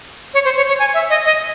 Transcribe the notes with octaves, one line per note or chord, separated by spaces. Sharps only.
C#5
C5
C#5
C#5
G#5
E5
D#5
D#5